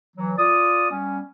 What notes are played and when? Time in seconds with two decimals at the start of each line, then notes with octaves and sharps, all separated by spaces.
0.17 E3 F#3
0.38 F4 D5 D#6
0.90 G3 B3 C#4